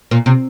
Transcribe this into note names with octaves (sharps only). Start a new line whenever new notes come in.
A#2
C3